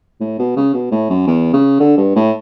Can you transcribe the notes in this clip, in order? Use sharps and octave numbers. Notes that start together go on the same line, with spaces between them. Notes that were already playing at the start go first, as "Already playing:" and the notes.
A2
B2
C#3
B2
A2
F#2
E2
C#3
D3
G2
A2